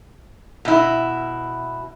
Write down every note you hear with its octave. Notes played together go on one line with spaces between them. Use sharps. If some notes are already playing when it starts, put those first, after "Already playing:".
B2 E4